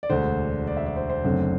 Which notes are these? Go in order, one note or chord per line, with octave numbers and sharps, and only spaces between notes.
D5
E1 D2 D3 C5
D5
E5
D5
C5
C5
F#1 F#2 D3 A3 C4